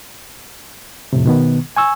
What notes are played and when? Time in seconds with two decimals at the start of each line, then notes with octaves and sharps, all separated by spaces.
1.13 F2 A2 C3
1.26 B2 D#3 B3
1.76 G#5 C#6 E6